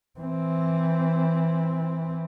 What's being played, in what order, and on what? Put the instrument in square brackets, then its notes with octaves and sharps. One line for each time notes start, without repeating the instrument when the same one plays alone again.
[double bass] E3 C4